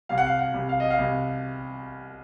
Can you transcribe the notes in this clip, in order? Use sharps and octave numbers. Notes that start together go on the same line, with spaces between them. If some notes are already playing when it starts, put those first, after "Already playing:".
C2 F5
F#5
F5
F#5
C2
F5
D#5
F5
C2